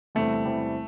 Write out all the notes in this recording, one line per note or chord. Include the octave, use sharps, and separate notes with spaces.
E2 C3 E3 G3 A3 C4
E2 C3 E3 G3 C4